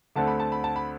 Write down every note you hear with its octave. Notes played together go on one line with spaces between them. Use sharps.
D2 D3 A3 C4 A5
B5
A5
B5
A5
B5